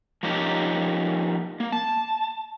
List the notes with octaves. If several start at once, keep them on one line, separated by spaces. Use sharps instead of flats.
F3 A#3 C#4 D#4 G4
A#3
A5